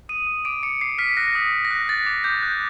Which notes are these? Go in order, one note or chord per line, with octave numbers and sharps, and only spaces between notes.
D#6 D#7
D#6
D6 D7
D6 C#7
D6 C7
F6 B6
F#6 A#6
D#6
D#6
A#6
F#6
F#6 A6
D6
D6 G6
F#6